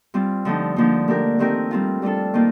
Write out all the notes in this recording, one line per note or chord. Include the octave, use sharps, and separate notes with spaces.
G3 C4 F4
D3 F3 A3 D#4
D3 F3 A#3 D#4
A3 D4 G4 A#4
D#3 A3 C4 G4 A#4
G3 C4 F4
G3 D4 F4 A4
D#3 A#3 F4